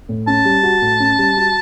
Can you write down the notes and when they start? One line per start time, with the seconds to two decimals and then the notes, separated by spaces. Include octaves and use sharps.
0.09 A2
0.27 C#4 A5
0.45 G3
0.63 F#4
0.82 A2
1.00 C#4
1.19 G3
1.37 F#4